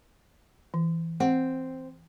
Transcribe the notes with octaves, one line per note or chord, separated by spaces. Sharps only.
E3
C4 F#5